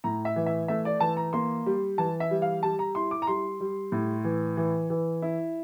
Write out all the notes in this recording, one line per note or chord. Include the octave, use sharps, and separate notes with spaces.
A2 A#5
E5
E3
E5
A3 E5
D5
E3 A5
A#5
A#3 C6
G3
E3 A5
E5
G3
F5
G3 A5
A#5
E4 C6
D6
A#5
G3 C6
G3
A2
E3
E3
E3
E4